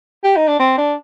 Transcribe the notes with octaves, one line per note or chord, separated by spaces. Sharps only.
G4
D#4
D4
C4
D4